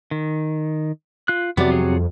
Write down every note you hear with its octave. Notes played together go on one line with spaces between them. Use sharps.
D#3
F4 F#6
F2 C3 F#3 B3 D5
F4 G#4 C#5